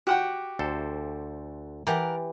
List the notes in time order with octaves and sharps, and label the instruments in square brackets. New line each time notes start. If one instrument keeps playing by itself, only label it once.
[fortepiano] F#4 F#5 G5 [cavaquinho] G4
[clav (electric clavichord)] D2 A4 C5
[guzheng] E3 G4 [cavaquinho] A#4 F#5 A5